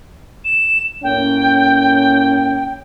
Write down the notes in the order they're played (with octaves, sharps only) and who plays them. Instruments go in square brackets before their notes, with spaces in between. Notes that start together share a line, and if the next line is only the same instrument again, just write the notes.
[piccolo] E7
[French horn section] A2 A#3 C#4 [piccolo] G5